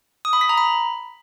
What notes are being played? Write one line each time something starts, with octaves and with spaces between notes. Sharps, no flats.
D#6
B5
B6
A#5
B5